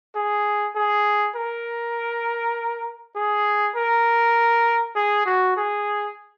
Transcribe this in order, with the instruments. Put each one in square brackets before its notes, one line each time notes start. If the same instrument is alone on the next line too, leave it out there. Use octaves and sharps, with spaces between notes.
[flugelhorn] G#4
G#4
A#4
G#4
A#4
G#4
F#4
G#4